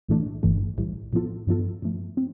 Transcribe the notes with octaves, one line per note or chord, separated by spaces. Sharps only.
B1 A2 E3 A3 D4
G1 G2 E3 A3
B1 A2 E3 G3
A2 F3 B3 F4 A4
G2 F3 B3 F4 A4
G2 F3 A3
C4